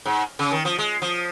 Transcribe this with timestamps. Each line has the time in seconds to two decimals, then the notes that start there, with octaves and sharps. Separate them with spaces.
0.05 G#2
0.39 C#3
0.51 D#3
0.65 F3
0.79 G#3
1.02 F3